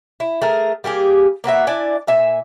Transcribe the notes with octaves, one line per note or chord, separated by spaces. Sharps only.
E4
A3 G#4 A#4
G3 A#3 G4 G#4
A#3 B3 F#4 E5
D4 E4 D5 G#5
A#2 E5 G#5